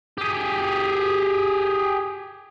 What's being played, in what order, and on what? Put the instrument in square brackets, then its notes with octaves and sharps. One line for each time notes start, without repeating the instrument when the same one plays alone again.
[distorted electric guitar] G4 G#4